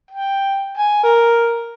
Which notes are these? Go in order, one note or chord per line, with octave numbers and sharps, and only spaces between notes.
G5
G#5
A#4